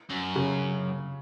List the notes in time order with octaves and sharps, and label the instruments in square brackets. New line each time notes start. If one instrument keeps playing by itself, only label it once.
[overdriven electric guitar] F#2
[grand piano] C#3